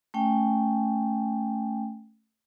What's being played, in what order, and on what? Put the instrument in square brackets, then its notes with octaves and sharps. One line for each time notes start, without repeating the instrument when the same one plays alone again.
[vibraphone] A3 C#4 G5 G#5